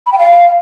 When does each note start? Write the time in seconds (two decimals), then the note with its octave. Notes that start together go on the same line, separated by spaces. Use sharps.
0.06 B5
0.12 G5
0.18 F5